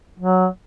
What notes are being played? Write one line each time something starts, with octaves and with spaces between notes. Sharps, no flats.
F#3